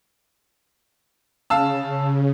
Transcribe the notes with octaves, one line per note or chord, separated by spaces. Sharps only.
C#3 F5 A5 E6